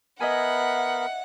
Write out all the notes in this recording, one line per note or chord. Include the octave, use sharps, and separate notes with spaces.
B3 A#4 D#5 E5 F#5 G#5 B5